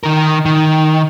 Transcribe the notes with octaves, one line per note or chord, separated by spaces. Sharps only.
D#3 A#4
D#3